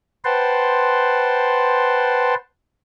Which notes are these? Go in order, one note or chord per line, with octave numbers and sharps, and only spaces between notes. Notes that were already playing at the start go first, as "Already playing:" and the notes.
B4 C5 F#5 G5 A5 C6